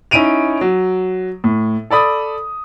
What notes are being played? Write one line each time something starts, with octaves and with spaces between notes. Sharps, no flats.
C#4 D#4 E4 D7 D#7 F7
F#3
A2
A4 D5 B5 D#6